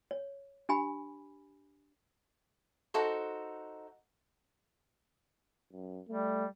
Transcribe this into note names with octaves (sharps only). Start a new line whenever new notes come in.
C#5
D4 G4 G#5 B5
D#4 F#4 A4 C5
F#2
G3 A3